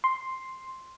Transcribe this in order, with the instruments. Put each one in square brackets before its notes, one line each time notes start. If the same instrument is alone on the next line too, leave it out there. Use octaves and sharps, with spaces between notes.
[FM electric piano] C6